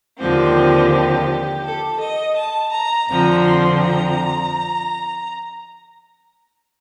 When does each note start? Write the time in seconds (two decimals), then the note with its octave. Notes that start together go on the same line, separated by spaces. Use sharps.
0.18 D#2 D3 F3 C4 G4
1.64 A4
1.99 D#5
2.36 A5
2.72 A#5
3.08 F2 D3 F3 C4 A#5
3.43 C6
3.80 A#5